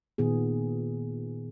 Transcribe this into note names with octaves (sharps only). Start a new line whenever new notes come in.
A#2 D#3 B3 G#4